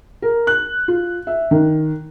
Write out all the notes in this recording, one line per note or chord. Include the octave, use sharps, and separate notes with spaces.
A#4
F#6
F4
E5
D#3